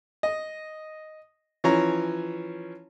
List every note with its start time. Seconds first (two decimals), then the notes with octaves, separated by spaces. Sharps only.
0.23 D#5
1.64 E3 F3 C#4 C#5 A#5